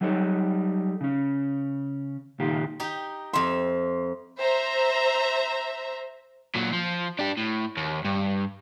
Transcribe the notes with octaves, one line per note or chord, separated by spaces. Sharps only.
F#3 G3 D#4 A4 A#4 C#5
C#3 C#4
C#2 A#2 D#3 F4 G4
D#4 G4
F2 E5 C6
C5 E5 A#5
A#2 F#3
F3
D4 G4
A2
D#2
G2